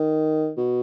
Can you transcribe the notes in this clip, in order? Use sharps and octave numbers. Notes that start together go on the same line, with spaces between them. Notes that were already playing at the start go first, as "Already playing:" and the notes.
Already playing: D#3
B2